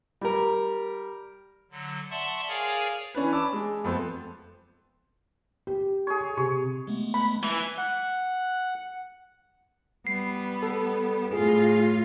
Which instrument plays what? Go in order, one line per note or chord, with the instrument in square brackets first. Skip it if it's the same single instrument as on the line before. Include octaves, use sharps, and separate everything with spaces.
[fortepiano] G3 A#4
[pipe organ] D3 F#3
D5 E5 F#5 A5 C6 C#6
G#4 A#4 C#5 D5 F5 G#5
[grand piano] E3 C#4 D4 B4
A5 B5 D6 E6
G#3 D6
F2 A3 B3 C4 C6
[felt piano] G4
[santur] G#4 C#5
[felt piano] C3 [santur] C#6
[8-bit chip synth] G#3 A3 B3
[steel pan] B5
[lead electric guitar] E3
[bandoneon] F#5 F#6
[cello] G3 B3 [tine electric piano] C7
[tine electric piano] A4
[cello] A2 F4 [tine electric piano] G#4